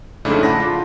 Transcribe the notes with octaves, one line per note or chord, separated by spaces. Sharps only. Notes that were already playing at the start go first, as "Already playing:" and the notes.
F2 G#2 C#3 A3 D4 E4
F#5 A5 B5 D6 A#6
F4